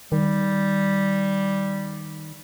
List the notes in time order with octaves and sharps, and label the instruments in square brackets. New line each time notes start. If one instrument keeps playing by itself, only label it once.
[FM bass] D#3 [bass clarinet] G3